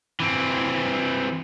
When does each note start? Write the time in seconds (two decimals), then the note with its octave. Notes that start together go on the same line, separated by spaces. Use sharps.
0.20 E3 C4